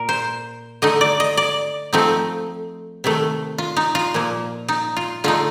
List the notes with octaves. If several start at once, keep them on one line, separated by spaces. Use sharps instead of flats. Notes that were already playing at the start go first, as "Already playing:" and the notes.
Already playing: A#2 A#4
C5
D3 A3 D#4 D#5
D5
D#5
D5
F3 A3 C4 D#4
C3 D#3 A3
F4
D#4
F4
A#2 F3 A#3
D#4
F4
D3 A3 D#4 F4